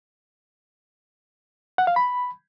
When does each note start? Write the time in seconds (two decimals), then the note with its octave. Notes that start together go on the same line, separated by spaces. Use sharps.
1.78 F#5
1.87 F5
1.96 B5